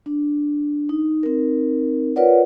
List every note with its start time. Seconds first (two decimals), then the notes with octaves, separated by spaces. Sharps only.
0.06 D4
0.89 D#4
1.23 C4 D#4 A#4
2.16 F4 A#4 B4 C#5 D5 F#5